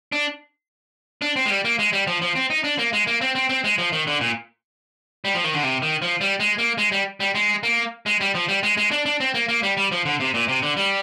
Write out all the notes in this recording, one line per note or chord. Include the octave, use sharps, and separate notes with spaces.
D4
D4
C4
G#3
G3
A#3
G#3
G3
F3
F3
C4
D#4
D4
A#3
G#3
A#3
C4
C4
C4
G#3
F3
D#3
D3
A#2
G3
F3
D#3
D3
C3
D#3
F3
G3
G#3
A#3
G#3
G3
G3
G#3
A#3
G#3
G3
F3
G3
G#3
G#3
D4
D4
C4
A#3
A#3
G3
G3
F3
D3
C3
A#2
C3
D3
G3